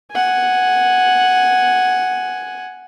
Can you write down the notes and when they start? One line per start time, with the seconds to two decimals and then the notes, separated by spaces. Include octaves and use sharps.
0.12 F#5 G#5